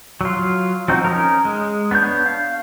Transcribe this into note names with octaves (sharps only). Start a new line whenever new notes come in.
F#3 F4
F3 C4 D#4 F#4
C#4 D#4 A#4
G#3
B3 D4 C#5 G6
F5